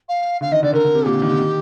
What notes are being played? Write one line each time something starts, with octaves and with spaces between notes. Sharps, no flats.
F5
D3 F5
D#3 D#5
D3 D5
D3 A#4
D3
C3
A#2 G4
D3
D#3
D3
D#3